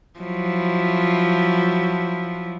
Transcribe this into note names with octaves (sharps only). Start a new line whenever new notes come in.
F3 F#3 E4